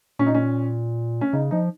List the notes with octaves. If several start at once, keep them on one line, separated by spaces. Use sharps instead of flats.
A#2 C#4
D#4
C#4
C#4
C#3 D#4
F3 D#4